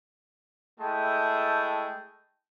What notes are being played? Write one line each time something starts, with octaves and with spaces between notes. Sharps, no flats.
G#3 A3 E4 G5 A5